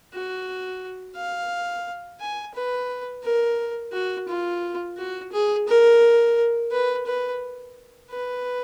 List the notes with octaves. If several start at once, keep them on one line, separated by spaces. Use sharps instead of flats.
F#4
F5
G#5
B4
A#4
F#4
F4
F#4
G#4
A#4
B4
B4
B4